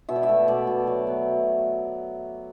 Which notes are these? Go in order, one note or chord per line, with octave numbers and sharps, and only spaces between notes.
B2 E5
D5
E5
A3
B2 D5
B2
F#3
B3